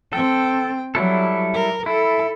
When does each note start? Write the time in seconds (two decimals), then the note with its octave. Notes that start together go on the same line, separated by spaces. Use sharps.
0.13 C4 A4 G5
0.95 F#3 G3 E4 A4
1.54 A#4
1.86 E4 A4